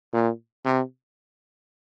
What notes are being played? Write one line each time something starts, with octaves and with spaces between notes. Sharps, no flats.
A#2
C3